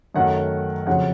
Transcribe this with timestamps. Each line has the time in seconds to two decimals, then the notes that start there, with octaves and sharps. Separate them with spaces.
0.15 F#2 D#3 F#3 A3 F#5
0.87 F2 C#3 F#3 F#5